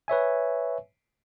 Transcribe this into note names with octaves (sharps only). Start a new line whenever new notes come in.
B4 C#5 E5 G#5